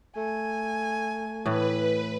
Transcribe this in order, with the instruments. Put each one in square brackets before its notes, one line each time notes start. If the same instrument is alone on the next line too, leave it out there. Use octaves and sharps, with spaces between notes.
[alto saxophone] A3 [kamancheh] G#5
[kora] A2 E3 [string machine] B4